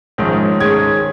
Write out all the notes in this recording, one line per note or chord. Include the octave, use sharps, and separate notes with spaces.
A#1 G#2 D#3 C#4
G#2 D#3 G#3 C#4 G#6